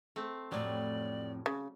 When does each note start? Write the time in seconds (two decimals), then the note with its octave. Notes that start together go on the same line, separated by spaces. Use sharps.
0.16 A3 C4
0.52 F2 A2 F#3 G3 D5
1.46 C#3